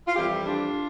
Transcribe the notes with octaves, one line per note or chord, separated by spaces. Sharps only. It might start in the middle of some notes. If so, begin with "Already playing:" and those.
F4
F2 E3 G3 E4 G4
D4 F4